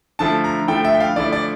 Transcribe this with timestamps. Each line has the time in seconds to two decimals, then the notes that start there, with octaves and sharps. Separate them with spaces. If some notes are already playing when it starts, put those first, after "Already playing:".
0.19 D3 F3 A3 E4 A5
0.44 A#5
0.67 D3 F3 A3 E4 G5
0.85 E5
0.94 G5
1.00 F5
1.16 D3 F3 A3 E4 D5
1.32 D5